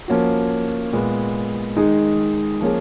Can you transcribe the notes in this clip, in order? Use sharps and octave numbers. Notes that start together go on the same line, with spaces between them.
F3 A#3 C#4 F#4
A#2 G#3 B3
D#3 G#3 D#4 G#4
F3 A#3 C#4 G#4